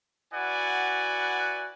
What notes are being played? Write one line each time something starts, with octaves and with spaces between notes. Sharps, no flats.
E4 F#4 B4 D5 F#5 G#5